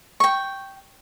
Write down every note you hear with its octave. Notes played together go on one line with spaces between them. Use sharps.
G5 C#6